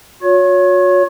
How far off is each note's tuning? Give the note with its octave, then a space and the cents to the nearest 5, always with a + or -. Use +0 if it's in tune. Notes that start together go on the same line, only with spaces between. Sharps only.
F#4 -40 C#5 +15